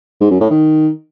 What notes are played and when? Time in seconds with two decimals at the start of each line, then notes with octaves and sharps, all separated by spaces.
0.21 G#2
0.31 F#2
0.41 A2
0.50 D#3